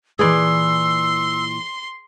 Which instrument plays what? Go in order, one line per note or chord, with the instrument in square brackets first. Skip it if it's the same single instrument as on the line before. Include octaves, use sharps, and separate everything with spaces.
[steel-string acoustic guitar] A#2 E3 [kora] G#4 B4 D5 [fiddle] C6 [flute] E6